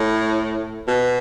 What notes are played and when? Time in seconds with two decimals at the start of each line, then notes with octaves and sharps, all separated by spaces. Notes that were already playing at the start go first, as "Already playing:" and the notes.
Already playing: A2
0.88 B2